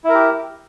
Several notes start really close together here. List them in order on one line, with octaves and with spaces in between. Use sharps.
E4 A#4 G4